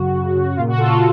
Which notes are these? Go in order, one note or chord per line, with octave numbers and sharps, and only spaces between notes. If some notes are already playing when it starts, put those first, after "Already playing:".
Already playing: F#2 C#3 F#4
C#3
C#3
A#2 F4
F#4
A#2 F4 A4
F4 A4